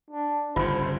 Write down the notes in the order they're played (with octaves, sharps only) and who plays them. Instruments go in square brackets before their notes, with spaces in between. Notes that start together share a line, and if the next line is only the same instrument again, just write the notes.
[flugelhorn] D4
[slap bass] G1 C#3 [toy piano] F4 [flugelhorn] C5